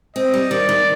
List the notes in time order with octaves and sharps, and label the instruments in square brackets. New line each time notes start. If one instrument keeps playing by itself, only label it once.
[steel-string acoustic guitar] C4 [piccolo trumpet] D#5
[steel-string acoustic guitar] G3
[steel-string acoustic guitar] D#3 [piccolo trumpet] D5
[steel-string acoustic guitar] D#3